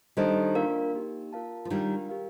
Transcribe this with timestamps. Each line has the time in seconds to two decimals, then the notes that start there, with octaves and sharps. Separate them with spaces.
0.17 D#3 G3 D4 A4 C5 D#5 A5
0.55 A#3 D4 F4 A#4 F5
0.94 A#3 D#4 G4
1.33 F4 A#4 F5 A5
1.65 F3
1.70 D#3 G3 D4 F4 A#4 F5
2.09 G4 A#4 F5